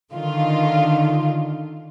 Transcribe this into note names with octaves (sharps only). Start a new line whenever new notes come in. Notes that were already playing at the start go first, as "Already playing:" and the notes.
D3 D#3 F4